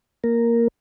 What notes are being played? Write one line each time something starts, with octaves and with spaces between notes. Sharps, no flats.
A#3 A#4